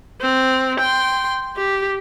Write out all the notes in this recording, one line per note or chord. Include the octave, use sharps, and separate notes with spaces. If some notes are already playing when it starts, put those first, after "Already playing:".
C4
G5 C6
G4